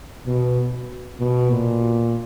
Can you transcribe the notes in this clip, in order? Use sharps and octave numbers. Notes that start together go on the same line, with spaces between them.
B2
B2
A#2